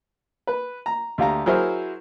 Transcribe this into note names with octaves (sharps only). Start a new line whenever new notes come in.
B4
A#5
D2 G4 F5 A#5
F#3 E4 G#4 A#4 C5